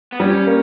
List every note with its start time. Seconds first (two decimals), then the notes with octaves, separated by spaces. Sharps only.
0.12 B3
0.20 G3 C#4
0.47 A#3